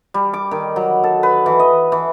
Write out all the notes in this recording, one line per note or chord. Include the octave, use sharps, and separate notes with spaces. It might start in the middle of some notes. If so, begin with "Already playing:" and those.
G3
D6
D#3
F#3
A4
B4
E3
D#5
E3